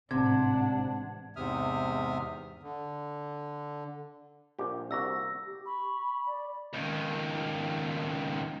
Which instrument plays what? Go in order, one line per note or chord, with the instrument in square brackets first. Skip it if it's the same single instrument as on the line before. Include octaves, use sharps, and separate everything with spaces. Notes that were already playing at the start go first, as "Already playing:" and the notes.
[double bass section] A1 G#2 C4 [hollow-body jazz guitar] C3 [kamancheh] D4 F#5 [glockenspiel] G#6
[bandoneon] E2 G#2 C3 E5 D#6 F6
D3
[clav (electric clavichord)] A#1 G4
[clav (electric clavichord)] C2 A#3 F#4 [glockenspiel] E6 A#6
[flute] G4
[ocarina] B5 [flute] C#6
[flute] D5
[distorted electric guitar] C#2 D#3